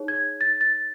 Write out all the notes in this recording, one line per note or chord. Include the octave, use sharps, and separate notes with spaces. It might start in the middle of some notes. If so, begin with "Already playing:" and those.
Already playing: D#4 G#4 C#5
G#6
A6
A6